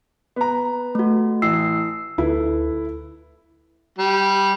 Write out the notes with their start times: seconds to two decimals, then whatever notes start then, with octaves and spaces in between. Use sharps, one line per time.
0.36 B3 A#5
0.95 A3 F#4
1.42 A1 E6 C7
2.18 D2 E4 A4 B4
3.98 G3